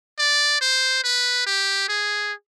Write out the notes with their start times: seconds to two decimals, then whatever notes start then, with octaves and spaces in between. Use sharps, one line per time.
0.19 D5
0.61 C5
1.04 B4
1.46 G4
1.88 G#4